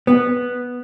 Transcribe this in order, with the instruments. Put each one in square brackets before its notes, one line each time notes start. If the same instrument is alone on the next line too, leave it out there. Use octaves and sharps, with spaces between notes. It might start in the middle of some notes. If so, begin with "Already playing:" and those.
[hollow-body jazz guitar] B3